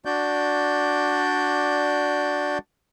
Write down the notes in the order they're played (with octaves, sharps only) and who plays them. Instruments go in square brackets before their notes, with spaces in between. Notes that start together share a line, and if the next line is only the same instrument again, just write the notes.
[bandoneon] D4 F#4 D5 G6